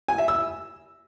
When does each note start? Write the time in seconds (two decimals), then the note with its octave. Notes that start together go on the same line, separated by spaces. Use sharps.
0.08 G#5
0.18 E5
0.28 E6